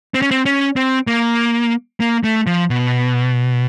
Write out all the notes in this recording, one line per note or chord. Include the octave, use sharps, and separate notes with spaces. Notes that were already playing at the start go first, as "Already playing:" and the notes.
C4
C#4
C4
C#4
C4
A#3
A#3
A3
F3
B2